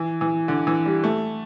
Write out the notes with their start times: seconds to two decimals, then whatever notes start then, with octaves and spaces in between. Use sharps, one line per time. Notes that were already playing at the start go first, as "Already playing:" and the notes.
Already playing: E3
0.21 E3
0.48 D3
0.67 E3
0.85 G3
1.04 A3